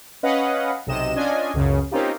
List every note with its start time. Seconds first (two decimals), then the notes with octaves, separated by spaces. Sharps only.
0.23 C#4 B4 D#5 F5 F#5
0.86 B1 C3 D#5 E7
1.16 C#4 D4 F4 D#5 G#5
1.54 C#2 F#2 C#3
1.91 A#3 C4 C#4 D#4 F4 G4